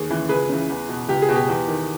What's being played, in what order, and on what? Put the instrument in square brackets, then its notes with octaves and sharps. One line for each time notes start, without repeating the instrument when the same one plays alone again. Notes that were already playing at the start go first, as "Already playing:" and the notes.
Already playing: [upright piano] D#2 G#4
C#3 E3
C#2 G#4 B4
C#3 E3
E2
B2
C#2 G4
G#4
B2
G4
E2
D#3